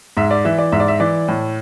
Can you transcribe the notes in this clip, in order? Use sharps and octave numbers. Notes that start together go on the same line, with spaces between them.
G#2 E5
D5
E3 E5
D5
G#2 E5
D5
E5
E3 D5
A2